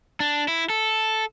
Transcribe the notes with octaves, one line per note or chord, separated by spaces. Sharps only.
D4
E4
A4